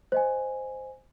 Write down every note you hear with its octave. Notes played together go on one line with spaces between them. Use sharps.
C5 D#5 G#5